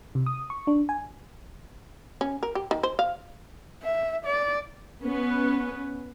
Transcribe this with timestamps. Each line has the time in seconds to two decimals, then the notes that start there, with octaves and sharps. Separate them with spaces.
0.15 C3
0.26 D#6
0.50 C#6
0.67 D4
0.89 G#5
2.21 C#4
2.43 A#4
2.55 G4
2.71 D#3
2.83 C5
2.99 F5
3.83 E5
4.26 D5
5.02 B3 C#4 B4